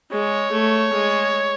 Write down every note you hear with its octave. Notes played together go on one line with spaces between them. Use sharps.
G#3 C#5
A3
G#3